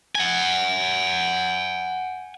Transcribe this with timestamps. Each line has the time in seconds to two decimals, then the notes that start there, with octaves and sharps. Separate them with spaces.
0.15 F#5 G#5